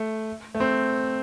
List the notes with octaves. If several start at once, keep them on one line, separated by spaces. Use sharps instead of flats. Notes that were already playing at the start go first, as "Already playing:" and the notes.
Already playing: A3
A3
C4